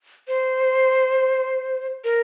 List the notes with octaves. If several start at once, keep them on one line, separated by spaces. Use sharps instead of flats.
C5
A#4